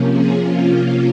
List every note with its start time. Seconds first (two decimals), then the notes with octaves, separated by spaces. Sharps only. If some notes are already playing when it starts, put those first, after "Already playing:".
Already playing: C3 F3 A#3 C#4
0.11 G#4
0.42 F4